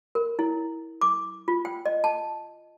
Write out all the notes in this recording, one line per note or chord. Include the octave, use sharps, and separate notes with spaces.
A#4
E4
D6
F4
G5
D#5
A5